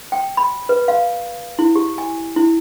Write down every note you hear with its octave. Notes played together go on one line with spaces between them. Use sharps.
G5
B5
B4
F5
E4
G4
G#5
E4